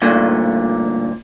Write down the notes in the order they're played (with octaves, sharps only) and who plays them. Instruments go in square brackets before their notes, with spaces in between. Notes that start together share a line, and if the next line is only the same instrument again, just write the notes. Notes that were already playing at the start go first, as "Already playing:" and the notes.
[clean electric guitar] D2 G2 A#2 D3